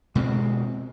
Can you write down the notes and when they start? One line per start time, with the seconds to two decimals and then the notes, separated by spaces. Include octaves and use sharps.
0.15 B2 G#3 B3 C4